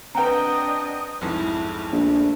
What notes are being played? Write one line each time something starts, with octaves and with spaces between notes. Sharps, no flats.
C4 D4 B4 D#5 F#5 G5 A#5
B1 F2 G#2 E4
A#1 A3